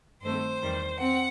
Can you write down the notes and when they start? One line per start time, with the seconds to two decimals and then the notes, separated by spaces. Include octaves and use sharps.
0.22 G2 D#3 A3 C4 C5
0.62 E2 D#3 G3
1.00 C4 F#5